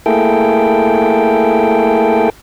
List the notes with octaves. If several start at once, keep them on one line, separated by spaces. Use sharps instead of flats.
A3 A#3 E4 G#4 A4 G5